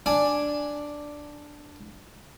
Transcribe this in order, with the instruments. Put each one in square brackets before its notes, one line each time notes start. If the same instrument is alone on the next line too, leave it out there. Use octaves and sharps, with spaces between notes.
[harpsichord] D4 D5 G#5